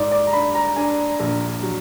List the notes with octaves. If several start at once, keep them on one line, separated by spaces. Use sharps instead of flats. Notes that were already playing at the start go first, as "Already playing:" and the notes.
Already playing: G#2 D5
D5
A#5
D4 B5
A#5
D4 G#5
A#1
F#3